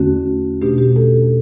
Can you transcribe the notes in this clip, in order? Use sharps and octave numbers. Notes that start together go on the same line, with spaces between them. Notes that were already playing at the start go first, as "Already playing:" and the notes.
Already playing: E2 D3 A3 C#4 F#4
B2 A3 D4 G4
G4
A4